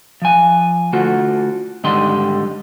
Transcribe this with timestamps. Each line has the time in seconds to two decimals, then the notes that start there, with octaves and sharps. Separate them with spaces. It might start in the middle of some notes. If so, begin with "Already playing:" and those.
0.22 F3 G#5
0.93 D3 A3 F4 F#4 A4
1.84 G#2 D3 D#3 G3 D#5 C6